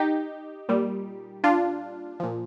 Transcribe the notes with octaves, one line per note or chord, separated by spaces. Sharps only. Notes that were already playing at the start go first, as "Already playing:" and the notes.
Already playing: D#4 G4
A#2 G3
D4 F4
A#2 F3